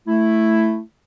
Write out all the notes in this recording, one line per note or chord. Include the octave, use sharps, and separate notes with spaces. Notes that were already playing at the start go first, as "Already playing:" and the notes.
A3 E4